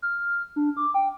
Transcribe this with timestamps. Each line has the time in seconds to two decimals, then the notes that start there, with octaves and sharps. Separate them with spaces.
0.02 F6
0.56 D4
0.77 D6
0.94 G5